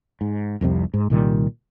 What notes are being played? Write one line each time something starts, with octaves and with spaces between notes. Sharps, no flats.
G#2
F1 C2 F2 C3
G#2
C2 A#2 D#3 G3